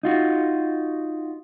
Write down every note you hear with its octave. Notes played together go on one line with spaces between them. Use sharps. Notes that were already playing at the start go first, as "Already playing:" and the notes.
D#4 F4 F#4